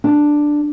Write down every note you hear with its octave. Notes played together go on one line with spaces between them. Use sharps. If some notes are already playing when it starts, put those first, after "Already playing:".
D4